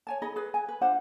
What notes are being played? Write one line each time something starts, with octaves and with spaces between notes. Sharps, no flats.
C#5 G#5 A5
D#4 G#4 D#5 B5
G#4 B4
G#5
B4
D4 F4 C5 F#5